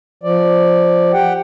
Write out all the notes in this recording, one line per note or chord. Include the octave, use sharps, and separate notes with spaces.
F3 D5
G4 F#5 G5